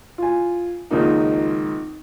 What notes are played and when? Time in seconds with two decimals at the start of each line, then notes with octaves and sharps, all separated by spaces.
0.18 F4 G#5
0.91 G#1 C#2 F3 A#3 D#4